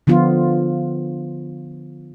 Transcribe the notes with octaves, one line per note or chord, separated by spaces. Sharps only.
D3 F3 B3 F4